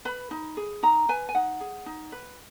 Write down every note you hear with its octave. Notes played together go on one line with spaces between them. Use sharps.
B4 B5
D#4
G#4
D#4 A#5
B4 G#5
G#5
D#4 F#5
G#4
D#4
B4